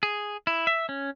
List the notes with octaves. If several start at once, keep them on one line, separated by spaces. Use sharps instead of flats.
G#4
E4
E5
C#4